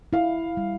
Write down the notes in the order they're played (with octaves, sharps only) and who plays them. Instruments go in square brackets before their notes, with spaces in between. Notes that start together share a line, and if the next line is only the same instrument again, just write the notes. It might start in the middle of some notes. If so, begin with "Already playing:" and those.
[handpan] E4 [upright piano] F5
[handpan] G3